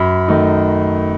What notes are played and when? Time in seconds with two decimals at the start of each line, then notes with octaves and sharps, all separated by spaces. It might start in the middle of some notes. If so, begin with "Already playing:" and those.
Already playing: F#2 B5
0.28 D#3 A3 D#4